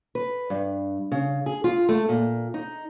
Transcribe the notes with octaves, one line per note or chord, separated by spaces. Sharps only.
B4
G2
C#3
G#4
F4
A3
A#2
D#4